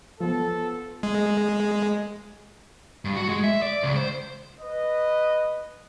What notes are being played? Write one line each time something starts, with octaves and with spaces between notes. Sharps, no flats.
F3 B3 A4
G#3
G2
F#4
G#3
E5
D5
C#2
C5
B4 D#5